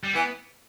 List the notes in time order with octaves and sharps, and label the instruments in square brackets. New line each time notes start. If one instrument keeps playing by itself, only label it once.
[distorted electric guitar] G3
[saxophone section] E3 [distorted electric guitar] B3